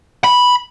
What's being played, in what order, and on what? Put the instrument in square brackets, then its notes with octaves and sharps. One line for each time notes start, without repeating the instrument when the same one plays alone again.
[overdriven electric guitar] B5